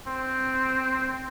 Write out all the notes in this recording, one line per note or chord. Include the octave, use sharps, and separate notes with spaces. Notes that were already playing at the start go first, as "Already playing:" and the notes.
C4